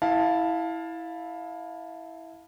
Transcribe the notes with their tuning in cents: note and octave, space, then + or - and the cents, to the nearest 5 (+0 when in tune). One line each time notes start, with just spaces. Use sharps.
E4 -10 F5 +15 A5 +0